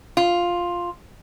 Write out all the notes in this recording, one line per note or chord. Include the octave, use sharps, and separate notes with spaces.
F4